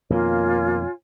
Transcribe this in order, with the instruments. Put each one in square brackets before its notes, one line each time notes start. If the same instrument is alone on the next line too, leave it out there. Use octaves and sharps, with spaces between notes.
[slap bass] F2 B2 D#3 [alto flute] A#3 [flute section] F4 C#5 G#5